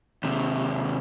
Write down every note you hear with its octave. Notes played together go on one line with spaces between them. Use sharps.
D#2 C3